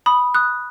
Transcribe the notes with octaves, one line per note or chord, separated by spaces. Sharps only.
B5 D#6
D#6 F#6